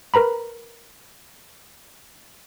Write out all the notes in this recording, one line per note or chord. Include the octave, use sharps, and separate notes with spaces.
A#4 B4 A#5 B5